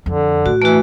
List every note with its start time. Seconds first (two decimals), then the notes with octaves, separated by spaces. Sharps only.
0.06 F2 D3
0.46 A2 F#4
0.62 E3 A3 F#4